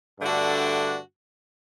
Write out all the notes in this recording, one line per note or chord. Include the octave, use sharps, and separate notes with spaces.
G2 D3 A3 D4 F#4